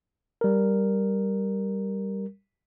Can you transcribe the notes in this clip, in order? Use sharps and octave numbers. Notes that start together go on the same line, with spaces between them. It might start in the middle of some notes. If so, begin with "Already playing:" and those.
G3 A#4